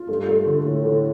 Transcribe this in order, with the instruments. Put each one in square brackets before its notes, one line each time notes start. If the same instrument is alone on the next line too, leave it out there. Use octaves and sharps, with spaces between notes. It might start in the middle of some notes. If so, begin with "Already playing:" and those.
Already playing: [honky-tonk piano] F4
[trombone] G2 [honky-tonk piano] A3
[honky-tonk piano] A3
D3
[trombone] A2 [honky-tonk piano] D3
[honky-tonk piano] D3